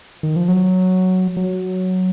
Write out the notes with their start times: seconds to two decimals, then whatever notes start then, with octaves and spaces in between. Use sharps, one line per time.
0.23 D#3
0.36 F3
0.48 F#3
1.37 F#3